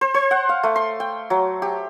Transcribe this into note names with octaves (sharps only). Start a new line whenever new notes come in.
C5
C5
F#5
F5
A3
C6
G5
F#3
G4